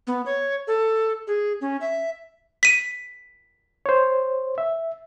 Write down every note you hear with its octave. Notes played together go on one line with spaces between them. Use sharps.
B3
C#5
A4
G#4
C#4
E5
B6 D#7
C5 C#5
E5